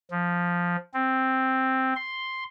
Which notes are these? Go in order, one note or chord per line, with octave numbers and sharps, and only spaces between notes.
F3
C4
C6